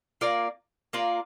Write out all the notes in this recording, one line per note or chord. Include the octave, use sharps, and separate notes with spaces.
A#3 F4 A#4 D5
A#3 F4 A#4 D5